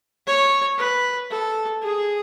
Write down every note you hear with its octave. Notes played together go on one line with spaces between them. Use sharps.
C#5
B4
A4
G#4